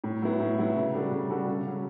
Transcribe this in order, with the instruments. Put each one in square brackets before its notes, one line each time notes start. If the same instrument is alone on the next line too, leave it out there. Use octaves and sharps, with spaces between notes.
[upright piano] A2
F#3 B3 E4
A2
F#3 B3 E4
C#3
G3 D4 F#4 A4
C#3
G3 D4 F#4 A4
C#3
F#3 C#4